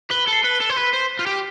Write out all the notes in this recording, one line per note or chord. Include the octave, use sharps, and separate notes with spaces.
B4 G7
A4
C7
B4
G7
A4
C5
B4 B6
C5
B6
F4 G6
G4